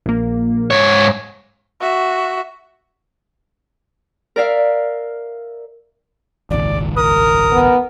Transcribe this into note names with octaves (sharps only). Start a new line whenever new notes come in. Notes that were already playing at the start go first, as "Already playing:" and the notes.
A#1 A#3
G#2 C#5
F#4 E5
A#4 D5 E5 F5
D#1 G#1 C#2 D5
A#4 D#6
B3